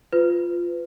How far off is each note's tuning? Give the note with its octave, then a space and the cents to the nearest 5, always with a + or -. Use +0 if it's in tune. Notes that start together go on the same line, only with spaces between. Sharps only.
F4 +0 B4 +25